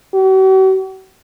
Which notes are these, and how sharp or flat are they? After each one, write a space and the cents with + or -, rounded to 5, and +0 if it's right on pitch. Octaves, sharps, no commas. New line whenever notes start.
F#4 +45